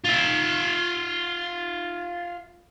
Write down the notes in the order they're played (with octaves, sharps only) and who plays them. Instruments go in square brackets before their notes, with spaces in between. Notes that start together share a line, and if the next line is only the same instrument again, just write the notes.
[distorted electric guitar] F4 E5